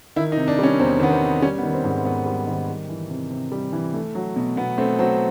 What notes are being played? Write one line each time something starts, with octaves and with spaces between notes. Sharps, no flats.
D#3 E4
D#4
C3
D4
G3 C#4
E2 C4
D#3 B3
C4
C3
G3 C#4
B3
D#3
C4
G#2
B3
G#2 B3
G3
D#3
G3
E3
C3
C3
G3
E3
A3
F#3
B2
B2 B3
A3 C4
F#3 C4